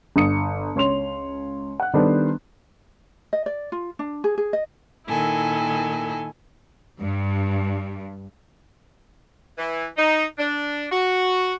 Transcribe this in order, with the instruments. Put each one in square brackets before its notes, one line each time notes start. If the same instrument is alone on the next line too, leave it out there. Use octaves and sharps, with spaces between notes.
[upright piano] G1 D#6 C#7
C#2 C#5 C6 F7
F#5 F#6
D#3 G3 B3 D4 A4 C5
[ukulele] D#5
D5
F4
D4
G#4
G#4
D#5
[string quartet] A#2 D#3 E4 A4 G#5
[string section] G2
[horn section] E3
D#4
D4
F#4